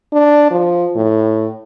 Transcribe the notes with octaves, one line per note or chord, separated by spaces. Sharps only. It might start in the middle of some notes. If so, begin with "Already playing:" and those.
D4
F3
A2